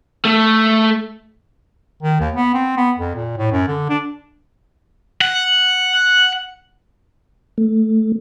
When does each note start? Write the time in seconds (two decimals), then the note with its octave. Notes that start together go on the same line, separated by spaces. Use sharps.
0.25 A3
2.03 D#3
2.20 D#2
2.35 B3
2.54 C4
2.77 B3
2.99 F2
3.15 A#2
3.37 A2
3.52 F#2
3.68 D3
3.89 D4
5.21 F#5
7.58 A3